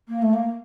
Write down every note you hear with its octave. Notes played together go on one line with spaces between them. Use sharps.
A#3
A3
A#3